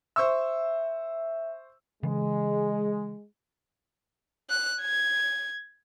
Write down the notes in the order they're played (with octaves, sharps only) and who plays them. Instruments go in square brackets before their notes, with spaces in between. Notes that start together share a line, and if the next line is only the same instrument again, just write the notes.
[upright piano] C5 C#6 E6 [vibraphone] E5
[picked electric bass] C#3 E3 [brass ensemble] G#3
[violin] F#6
G#6